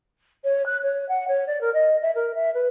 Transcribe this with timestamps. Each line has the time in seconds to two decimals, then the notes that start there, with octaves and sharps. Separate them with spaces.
0.44 C#5
0.66 F#6
0.83 C#5
1.08 F#5
1.27 C#5
1.46 D5
1.61 A#4
1.73 D#5
2.02 E5
2.15 A#4
2.34 E5
2.54 B4